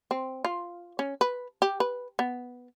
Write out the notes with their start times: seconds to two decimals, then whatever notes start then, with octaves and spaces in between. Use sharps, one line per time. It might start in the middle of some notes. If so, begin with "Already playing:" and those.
0.11 C4
0.45 F4
0.99 C#4
1.21 B4
1.62 G4
1.80 B4
2.19 B3